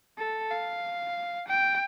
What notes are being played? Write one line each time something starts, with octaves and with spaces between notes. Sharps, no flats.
A4
F5
G5